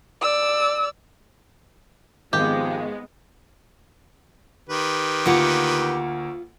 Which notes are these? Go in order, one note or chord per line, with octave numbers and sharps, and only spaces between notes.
D5 E6
G#1 F3 G#3 B3 G4
D#3 G4 B4
D2 A#3 F4 F#5